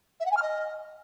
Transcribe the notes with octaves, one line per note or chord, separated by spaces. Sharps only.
E5
F#5
G#5
F6
D#5